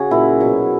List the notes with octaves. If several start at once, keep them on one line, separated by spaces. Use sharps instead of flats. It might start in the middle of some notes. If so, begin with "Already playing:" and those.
Already playing: C#3 F#4 G#4
A#2 F#3 E4
B2 F#3